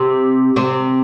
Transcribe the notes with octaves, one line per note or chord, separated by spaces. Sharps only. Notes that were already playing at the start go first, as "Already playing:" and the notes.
Already playing: C3 C4
C3 C4